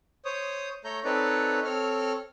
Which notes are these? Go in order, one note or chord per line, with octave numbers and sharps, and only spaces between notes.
C5 C#5 D#6
A3 A4 C#5 A#5 G6
C4 D#4 A4 B4 C#5 D5
C4 A4 C#5 F6